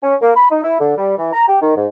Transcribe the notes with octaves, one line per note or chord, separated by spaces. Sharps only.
C#4
A#3
B5
D#4
E4
D3
G3
E3
A#5
G4
D#3
G#2